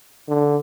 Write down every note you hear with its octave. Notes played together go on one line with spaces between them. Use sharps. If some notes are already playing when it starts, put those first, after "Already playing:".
D3